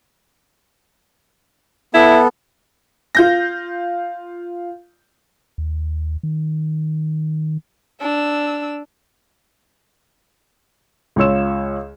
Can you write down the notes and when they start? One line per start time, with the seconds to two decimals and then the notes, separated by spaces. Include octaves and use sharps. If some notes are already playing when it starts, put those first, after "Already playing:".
1.94 B3 E4 A4
3.15 F4 G6 A#6
5.58 D#2
6.23 D#3
8.01 D4 E6
11.16 C#2 F4 C#5 E6 E7